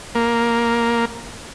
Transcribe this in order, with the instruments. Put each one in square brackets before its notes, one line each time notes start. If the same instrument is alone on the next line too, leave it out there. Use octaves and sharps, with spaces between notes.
[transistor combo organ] A#3